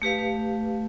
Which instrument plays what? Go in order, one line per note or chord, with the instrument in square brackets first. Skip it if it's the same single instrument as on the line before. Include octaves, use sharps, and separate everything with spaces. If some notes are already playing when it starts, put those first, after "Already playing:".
[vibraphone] A3 G4 B4 F5